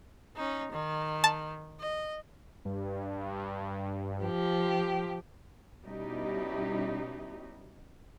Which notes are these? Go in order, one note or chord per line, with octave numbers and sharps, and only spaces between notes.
C#4 D#4
D#3
A5
D#5
G2
F3 G4
B2 G3 C#4 D#4 E4 G4